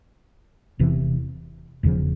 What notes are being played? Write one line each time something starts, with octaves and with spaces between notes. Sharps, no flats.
E1 E2 C3 E3
E1 E2 C#3 F3